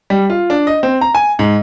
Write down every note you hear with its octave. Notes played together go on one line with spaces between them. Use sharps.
G3
F4
D4
D#5
C4
A#5
G#5
G#2